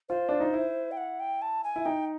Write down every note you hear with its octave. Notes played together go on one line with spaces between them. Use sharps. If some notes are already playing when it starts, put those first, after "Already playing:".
F4 C5
D4
D#4
E4
G5
F#5
G5
A5
G#5
E4
D#4 G5